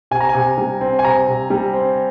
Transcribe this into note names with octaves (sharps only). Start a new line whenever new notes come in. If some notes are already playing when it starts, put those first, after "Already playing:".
C3 G#5
A#5
G#5
C3
G3
C4
G#5
C3 A#5
C3
G3
C4